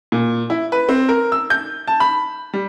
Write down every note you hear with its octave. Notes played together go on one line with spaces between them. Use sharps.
A#2
E4
B4
C4
A#4
E6
G6
A5
B5
G3